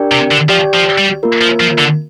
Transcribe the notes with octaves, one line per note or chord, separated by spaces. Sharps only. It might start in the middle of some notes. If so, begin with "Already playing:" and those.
Already playing: D4 G4 A#4 D5 G5
C3
D3
F3 G4 D5 G5
F3
G3
A#3 F4 A#4
F3
F3
D3